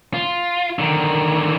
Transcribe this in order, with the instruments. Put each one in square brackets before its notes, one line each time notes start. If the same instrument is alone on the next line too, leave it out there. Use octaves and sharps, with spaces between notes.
[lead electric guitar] F4
D3 D#3